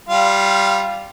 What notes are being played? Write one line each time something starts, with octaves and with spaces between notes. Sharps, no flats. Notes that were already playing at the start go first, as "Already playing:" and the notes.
G3 F4